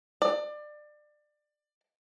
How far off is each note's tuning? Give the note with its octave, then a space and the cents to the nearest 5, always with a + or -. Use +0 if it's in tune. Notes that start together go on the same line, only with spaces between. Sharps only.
D5 +25